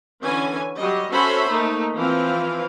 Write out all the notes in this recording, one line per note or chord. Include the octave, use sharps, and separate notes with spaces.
D3 E3 C#4 G#5
F#3 G3 D#5
C#4 F#4 A4 C5 E5 B5
A3 A#3 D#4
E3 F3 C4 F5